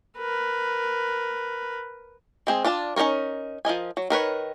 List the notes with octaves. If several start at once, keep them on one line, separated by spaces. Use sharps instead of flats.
A#4 B4
G#3 C4 G#4
D4 F4 D5 A5
C#4 D#4 A4 A#4 C#5
F3 A#4 D#5 G#5
F#3
D#3 A#4 B4 C#5